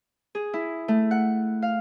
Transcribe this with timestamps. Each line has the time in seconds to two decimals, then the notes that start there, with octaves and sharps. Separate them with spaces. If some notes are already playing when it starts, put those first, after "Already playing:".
0.35 G#4
0.54 E4
0.88 A3
1.11 F#5
1.62 F5